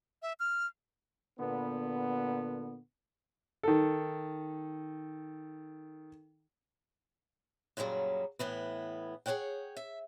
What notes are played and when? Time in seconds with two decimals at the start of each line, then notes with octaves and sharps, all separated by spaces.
0.22 E5
0.40 F6
1.39 A#2 D3 B3
3.63 D#3 A4
7.77 F#2 A#2 C#3 F#3 G3
8.39 A2 E3 B3
9.26 G#4 A4 C#5 F#5 G5
9.77 E5